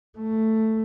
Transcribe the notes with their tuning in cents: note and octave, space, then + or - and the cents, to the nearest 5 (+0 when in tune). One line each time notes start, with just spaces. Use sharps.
A3 +5